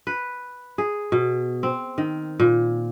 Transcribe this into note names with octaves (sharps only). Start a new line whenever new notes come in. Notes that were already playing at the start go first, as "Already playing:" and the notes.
B4
G#4
B2
C4
D#3
A#2